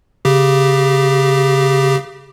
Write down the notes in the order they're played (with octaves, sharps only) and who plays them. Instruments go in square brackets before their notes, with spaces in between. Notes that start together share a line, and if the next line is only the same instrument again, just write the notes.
[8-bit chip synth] C#3 G4